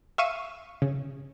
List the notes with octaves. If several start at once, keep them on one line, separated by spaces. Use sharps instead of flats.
E5 F5 C#6 E6 D#7
C#3